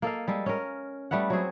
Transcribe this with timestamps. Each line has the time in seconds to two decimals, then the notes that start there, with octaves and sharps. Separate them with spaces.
0.02 A#3 A4 D#5 F5
0.28 G3 G#3 A4
0.46 C#4 A#4
1.11 G3 A3 B3 F#5
1.30 F#3 C4 G#4